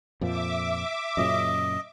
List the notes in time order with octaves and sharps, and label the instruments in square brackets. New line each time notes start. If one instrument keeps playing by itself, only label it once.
[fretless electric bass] F2 A#2 F3 [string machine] E5 D6
[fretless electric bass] F#2 A#2 C#3 [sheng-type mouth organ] D#5